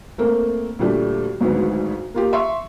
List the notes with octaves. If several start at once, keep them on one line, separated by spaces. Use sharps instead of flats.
A3 A#3 C4
D2 A#2 G3 A3 D4
G#1 D2 G#2 F#3 B4
A#3 F4 G4
E5 C6 C#6 E6